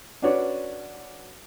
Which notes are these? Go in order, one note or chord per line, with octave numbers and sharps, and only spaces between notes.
C#4 D4 F#4 B4 C#5 D5